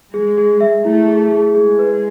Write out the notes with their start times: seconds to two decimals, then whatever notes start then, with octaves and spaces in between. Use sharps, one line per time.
0.13 G#3 G#4
0.38 G#4
0.61 E5
0.84 A3 E4
1.08 G#4
1.31 G#4
1.55 G#3 G#4
1.79 B4